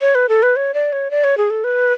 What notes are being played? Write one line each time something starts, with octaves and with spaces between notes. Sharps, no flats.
C#5
B4
A4
B4
C#5
D5
C#5
D5
C#5
G#4
A4
B4